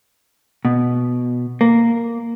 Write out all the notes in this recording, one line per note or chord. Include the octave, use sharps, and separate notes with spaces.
B2
A#3